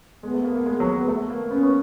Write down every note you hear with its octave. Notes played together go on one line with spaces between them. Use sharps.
G#3 B3
A3
A#3
A#3
G#3
F#3
G#3
A3
A#3
B3 C#4
B3